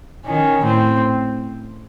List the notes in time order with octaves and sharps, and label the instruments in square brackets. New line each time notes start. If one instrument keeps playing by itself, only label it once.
[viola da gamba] D#3 [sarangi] C#4
[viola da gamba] A2 [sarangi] C4